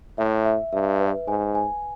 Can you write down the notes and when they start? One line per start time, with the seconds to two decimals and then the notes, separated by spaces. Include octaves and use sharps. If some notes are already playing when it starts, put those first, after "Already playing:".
0.18 A2 E5
0.45 E5
0.73 G2 E5
1.00 B4
1.27 G#2 G#5
1.55 G#5